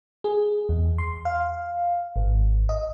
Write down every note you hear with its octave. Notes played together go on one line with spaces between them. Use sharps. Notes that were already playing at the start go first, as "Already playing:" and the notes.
G#4
E2
C6
F5
G#1
D#5